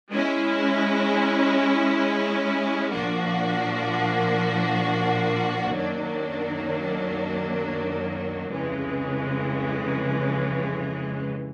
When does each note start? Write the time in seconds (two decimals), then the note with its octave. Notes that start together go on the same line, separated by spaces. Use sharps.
0.11 G#3 C#4 E4
2.91 A#2 F3 A#3 D4 F#4
5.71 F#2 D#3 F#3 A#3 D4
8.50 F2 C#3 E3 G#3